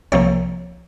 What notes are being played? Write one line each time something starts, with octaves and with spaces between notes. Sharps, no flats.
C2 C3 F3 A#3 C#5